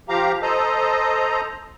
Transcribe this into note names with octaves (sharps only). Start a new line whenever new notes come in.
F3 G4 F5 A#5
A4 C5 D#5 A#5